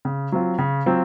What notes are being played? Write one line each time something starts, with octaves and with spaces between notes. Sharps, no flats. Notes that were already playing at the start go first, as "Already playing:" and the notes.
C#3
F#3 C4 F4
C#3
F#3 C4 F4